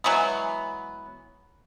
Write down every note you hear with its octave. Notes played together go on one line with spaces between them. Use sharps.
E3 F#3 G#3 B3